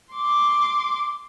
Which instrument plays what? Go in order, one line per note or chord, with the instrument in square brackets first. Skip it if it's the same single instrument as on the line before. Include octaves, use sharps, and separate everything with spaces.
[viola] C6 D6